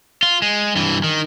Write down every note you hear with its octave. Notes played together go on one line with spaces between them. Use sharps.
F4
G#3
G2 E3
D#3